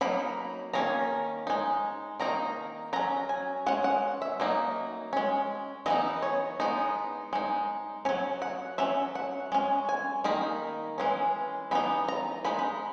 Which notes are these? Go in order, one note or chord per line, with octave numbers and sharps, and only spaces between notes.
F#3 A#3 D#4 B5
D#3 A#3 C#4 A#5
G#3 D#4
D#3 A#3 D#4 A#5
F#3 C#4 A#5
G#5
G#3 C#4 F#5
F#5
E5
F#3 A#3 D#4
G#3 C#4
E3 B3 D#4 D#5
C#5
G#3 B3 D#4
G#3 D#4
F#3 C#4 C#5
F#5
F#3 C#4 E5
F#5
G#3 C#4
G#5
D#3 A#3 D#4 B5
E3 G#3 C#4
E3 B3 D#4 B5
A#5
G#3 D#4 B5
B5